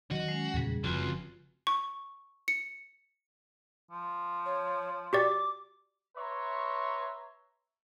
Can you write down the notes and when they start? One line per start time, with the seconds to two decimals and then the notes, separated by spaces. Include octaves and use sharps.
0.11 D#3 F#3 F#4 D#5
0.28 G#3 C#4
0.54 E2 A#2 C#3 G3 G#4
0.84 F#1 C#2 F3 C4 F4 F#4
1.67 C#6
2.48 C#7
3.91 F3
4.46 C#5
5.13 F#4 G4 D5 D6
6.17 B4 C#5 E5 A#5 C6 C#6